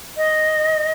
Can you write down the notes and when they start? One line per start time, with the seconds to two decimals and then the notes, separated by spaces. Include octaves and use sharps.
0.17 D#5